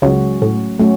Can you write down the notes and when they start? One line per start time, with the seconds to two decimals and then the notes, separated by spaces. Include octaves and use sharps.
0.02 C#2 C#3 F#3 C#4 F#4
0.42 A2
0.79 A2 F#3 C#4 F#4